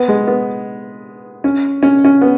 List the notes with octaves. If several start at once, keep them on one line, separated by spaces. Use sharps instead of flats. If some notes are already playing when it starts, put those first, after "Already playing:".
Already playing: B3
G#3
B3
C#4
C#4
C#4
B3